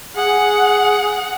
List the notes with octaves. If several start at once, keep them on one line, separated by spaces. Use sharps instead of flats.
G#4 F#5